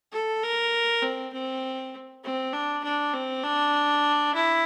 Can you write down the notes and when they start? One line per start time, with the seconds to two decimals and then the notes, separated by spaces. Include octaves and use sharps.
0.12 A4
0.43 A#4
1.02 C4
1.33 C4
2.24 C4
2.53 D4
2.83 D4
3.14 C4
3.44 D4
4.35 E4